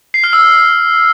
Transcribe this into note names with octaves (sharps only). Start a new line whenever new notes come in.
C7
F6
E6